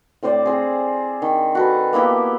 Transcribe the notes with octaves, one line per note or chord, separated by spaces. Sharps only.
A2 C4 C5 D5
C4 G#4
D#3
F#4 A4 B4
A#3 B3 E4 G4